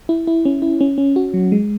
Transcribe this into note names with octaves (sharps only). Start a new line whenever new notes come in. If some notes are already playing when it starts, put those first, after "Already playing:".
E4
E4
C#4
E4
C#4
C#4
F#4
F#3
G#3